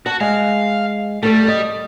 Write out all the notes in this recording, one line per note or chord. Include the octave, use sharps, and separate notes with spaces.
F#4 A5
G#3 F5
G3 A3 A4
D#5